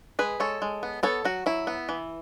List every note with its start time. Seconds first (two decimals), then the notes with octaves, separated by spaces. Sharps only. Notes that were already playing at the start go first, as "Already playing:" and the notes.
0.19 G#3 G#4 B4
0.40 G#3 A4 C#5
0.62 G#3
0.83 B3
1.03 B3 A4 C#5
1.25 F#3 F#4
1.46 F#3 E4
1.67 B3
1.89 E3